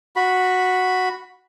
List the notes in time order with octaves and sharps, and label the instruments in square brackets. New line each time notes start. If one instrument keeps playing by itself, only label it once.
[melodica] F#4 B5